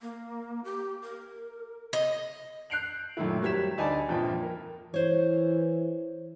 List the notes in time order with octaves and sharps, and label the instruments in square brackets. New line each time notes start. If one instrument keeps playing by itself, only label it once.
[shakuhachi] A#3
G4
A#4
[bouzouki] D#5
[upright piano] F#6 G6 C7 D7 F7 F#7
F#2 A#2 D#3 A3 E4
G#1 F#3 G3 G#6 B6 E7
D2 D#4 D5 G#5 A5 B5
G1 F2 A#2 G5
A#4
[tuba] E3 [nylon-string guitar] C5 C#5